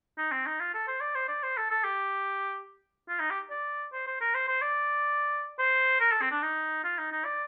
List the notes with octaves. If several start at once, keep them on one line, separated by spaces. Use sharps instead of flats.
D#4
C4
D#4
F4
A4
C5
D5
C5
D5
C5
A4
A4
G4
F4
D#4
G4
D5
C5
C5
A#4
C5
C5
D5
C5
A#4
A4
C4
D4
D#4
F4
D#4
D#4
D5